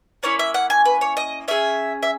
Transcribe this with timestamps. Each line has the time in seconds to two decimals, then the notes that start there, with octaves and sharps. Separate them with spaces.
0.23 A#3 C#4 E4 C#5
0.39 E5
0.54 F#5
0.70 G#5
0.85 B4
1.01 C#5
1.17 D#5
1.48 C#4 G#4 E5
2.03 E5